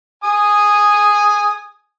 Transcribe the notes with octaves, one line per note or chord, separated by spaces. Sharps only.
G#5 D#6